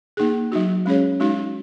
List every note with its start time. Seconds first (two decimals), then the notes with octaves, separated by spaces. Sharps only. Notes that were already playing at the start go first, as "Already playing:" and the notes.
0.17 A#3 D#4 G#4
0.52 F#3 D#4 F#4
0.86 G#3 C#4 G#4 C#5
1.20 G#3 D#4 F#4